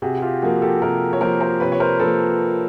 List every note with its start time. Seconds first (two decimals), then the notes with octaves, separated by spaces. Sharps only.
0.02 C3 F#4 G#4
0.17 F#4
0.22 F4 G4
0.42 F3 A#3 F#4 G#4
0.62 G4 A4
0.81 C3 G#4 A#4
1.13 C#5
1.20 F3 A#3 A#4 C5
1.40 A#4 C5
1.60 C3 B4 C#5
1.72 C#5
1.80 A#4 C5
2.00 F3 A#3 A4 B4